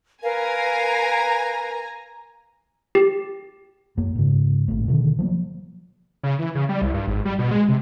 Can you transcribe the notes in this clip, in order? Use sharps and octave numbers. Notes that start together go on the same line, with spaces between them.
A#4 B4 F5 G#5 A#5
G4
F#2 A#3
G#2 C#3
G#1 A2
B2 D3 D#3
F3 F#3 A#3
C#3
E3
C#3
G3
C2
G2
G#1
G3
B2
G#3
C3